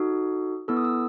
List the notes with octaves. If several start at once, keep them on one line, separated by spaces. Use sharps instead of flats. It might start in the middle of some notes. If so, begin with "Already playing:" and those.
Already playing: D#4 F#4 A4 D#6
B3 E4 A4 E6
D#6
E6